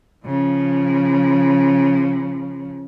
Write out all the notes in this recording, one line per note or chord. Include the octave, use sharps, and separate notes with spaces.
C#3 F3